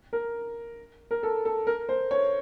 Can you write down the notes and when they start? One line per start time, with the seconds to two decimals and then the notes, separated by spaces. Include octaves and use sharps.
0.13 A#4
1.11 A#4
1.23 A4
1.45 A4
1.67 A#4
1.89 C5
2.11 C#5